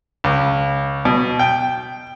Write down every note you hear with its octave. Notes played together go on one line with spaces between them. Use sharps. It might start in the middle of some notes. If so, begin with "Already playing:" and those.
C#2
B2
G5